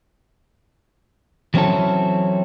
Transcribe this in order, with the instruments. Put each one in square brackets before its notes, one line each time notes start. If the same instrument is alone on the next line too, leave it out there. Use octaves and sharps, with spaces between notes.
[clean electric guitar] E3 F#3 C4 C#4 E4 A4